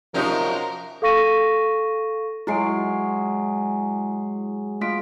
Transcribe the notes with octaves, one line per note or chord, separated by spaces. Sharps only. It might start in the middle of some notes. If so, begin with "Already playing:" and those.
F#2 C3 F3 F#3 D#4 G4 A#4 D#5
A4 F5 C#6 A#6 D#7
F#3 G#3 E4 C7 D7
A3 F4 B6 D7